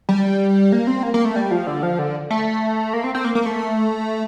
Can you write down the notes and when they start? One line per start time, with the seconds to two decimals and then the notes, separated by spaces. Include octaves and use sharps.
0.09 G3
0.72 A#3
0.87 C4
1.03 A#3
1.14 A#3
1.25 A3
1.36 G3
1.51 F3
1.67 D3
1.83 F3
1.99 D3
2.30 A3
2.93 A#3
3.04 C4
3.15 C4
3.25 A#3
3.35 A#3
3.46 A3